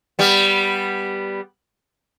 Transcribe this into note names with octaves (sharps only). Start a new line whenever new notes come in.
G3 B3